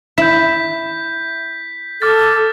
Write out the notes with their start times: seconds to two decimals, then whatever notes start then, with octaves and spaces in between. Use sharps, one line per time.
0.18 E4 G6 B6
2.02 A4 D6 F6 A6